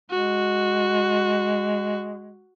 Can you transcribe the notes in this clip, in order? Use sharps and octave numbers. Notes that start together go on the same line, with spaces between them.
G#3 F#4